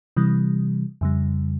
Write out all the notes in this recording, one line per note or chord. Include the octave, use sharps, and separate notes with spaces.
C3 E3 G3
F2 C#3 G3